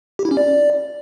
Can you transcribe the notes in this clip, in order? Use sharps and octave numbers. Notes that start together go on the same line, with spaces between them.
G4
E4
C#4
D5